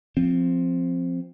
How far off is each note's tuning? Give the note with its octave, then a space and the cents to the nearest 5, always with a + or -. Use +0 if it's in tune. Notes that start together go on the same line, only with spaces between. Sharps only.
F3 +0 C4 +0